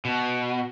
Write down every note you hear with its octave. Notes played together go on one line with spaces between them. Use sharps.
B2